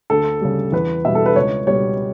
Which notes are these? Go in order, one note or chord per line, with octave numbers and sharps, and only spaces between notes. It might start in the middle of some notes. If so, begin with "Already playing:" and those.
D2 A4
C#3 G3
E2 B4
B2 G3 E5
A4
B4
C#2 C#5
B2 G3 C#5